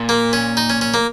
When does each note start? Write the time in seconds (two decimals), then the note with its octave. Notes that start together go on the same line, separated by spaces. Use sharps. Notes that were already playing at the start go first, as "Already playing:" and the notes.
Already playing: A#2
0.09 A#3
0.33 C#4
0.57 D#4
0.70 C#4
0.81 C#4
0.94 A#3